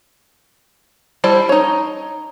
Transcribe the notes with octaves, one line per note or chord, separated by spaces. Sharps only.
G3 E4 C5 D5 A5
D#4 C#5